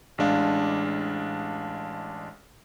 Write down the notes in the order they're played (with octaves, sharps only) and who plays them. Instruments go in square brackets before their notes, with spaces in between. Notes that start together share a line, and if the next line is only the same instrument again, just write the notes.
[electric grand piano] A1 G#3 D4 F5